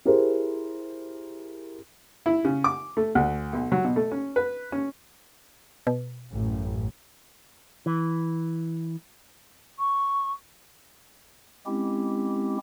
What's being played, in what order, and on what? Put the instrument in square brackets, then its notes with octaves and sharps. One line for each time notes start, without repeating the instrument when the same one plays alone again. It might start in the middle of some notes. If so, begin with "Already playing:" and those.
[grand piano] E4 G4 G#4 A#4 C5
[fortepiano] E4
C#3
D6
A3
D2
B1
F#3
B2
A3
C#4
B4
C#4
[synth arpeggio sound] B2
[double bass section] A1 F#2
[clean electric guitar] E3
[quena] C#6
[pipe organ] G#3 C4 C#4 E4 G4